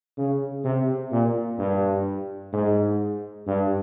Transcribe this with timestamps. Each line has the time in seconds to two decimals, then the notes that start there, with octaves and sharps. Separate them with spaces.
0.18 C#3
0.64 C3
1.12 A#2
1.59 G2
2.53 G#2
3.47 G2